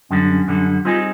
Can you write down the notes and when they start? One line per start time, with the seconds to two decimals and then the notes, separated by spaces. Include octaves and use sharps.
0.10 F#2 D3 G3 C#4
0.29 C#4
0.48 F#2 D3 G3
0.85 G3 C4 D#4 F4 G#4